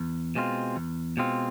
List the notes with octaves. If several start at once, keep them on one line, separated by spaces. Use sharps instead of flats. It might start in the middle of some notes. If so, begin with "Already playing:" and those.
Already playing: E2
B2 G#3 C4 F4
E2
B2 G#3 C4 F4